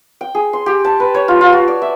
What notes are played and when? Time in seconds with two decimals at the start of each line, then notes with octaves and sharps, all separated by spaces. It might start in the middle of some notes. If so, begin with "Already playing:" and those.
0.21 G5
0.35 G#4
0.53 C6
0.66 G4
0.85 A5
1.00 B4
1.14 C#5
1.28 F4
1.41 F4
1.52 F#4
1.68 D5
1.82 E5